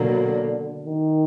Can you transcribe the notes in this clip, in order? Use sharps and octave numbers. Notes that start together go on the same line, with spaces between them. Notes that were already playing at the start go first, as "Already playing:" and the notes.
Already playing: B2 D3 F#3 A#3
D#3